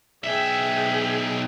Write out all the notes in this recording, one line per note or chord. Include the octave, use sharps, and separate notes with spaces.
B1 G#4 E5 G5